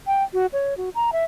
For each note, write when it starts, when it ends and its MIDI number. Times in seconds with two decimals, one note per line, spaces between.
0.07 0.23 79
0.34 0.46 66
0.53 0.76 73
0.77 0.89 66
0.95 1.10 82
1.12 1.24 76